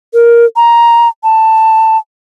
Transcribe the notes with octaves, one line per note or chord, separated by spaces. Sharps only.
A#4
A#5
A5